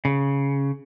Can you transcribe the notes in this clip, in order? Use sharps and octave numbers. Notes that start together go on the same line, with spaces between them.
C#3